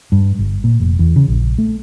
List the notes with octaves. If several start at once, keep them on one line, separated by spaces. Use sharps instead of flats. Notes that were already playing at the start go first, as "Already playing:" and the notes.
G2
G1
A#2
F1
E2
C#3
A#1
A3